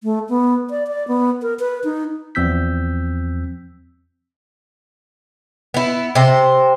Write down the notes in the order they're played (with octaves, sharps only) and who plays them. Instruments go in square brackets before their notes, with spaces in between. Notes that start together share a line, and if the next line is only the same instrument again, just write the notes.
[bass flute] A3
B3
D5
D5
B3
A#4
B4
D#4
[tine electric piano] E2 F3 C4 E6 G6 B6
[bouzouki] B3 E4
C3 C5